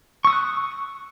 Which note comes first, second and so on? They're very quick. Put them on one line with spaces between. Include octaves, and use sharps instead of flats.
C#6 E6 D#6 F#6